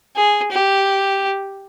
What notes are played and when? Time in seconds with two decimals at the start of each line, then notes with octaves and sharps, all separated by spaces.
0.16 G#4
0.52 G4